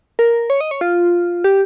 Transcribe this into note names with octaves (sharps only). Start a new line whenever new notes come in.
A#4
C#5
D#5
C#5
F4
G4